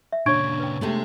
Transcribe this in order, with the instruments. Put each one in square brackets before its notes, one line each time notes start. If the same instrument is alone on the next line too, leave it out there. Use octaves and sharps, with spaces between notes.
[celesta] E5
[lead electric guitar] A#2 C#3 [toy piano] D4 C#5 [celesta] C#6 G#6 D7
[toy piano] B4 G5
[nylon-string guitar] C3 A3 B3 [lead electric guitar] G#3